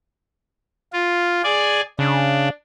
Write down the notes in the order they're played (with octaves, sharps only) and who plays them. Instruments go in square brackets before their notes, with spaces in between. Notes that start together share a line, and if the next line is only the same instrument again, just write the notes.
[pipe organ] F4
G#4 D5 G#5
[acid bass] C#3 [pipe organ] D4